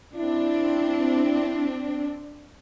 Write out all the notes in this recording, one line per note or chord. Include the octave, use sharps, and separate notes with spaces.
C4 D4 E4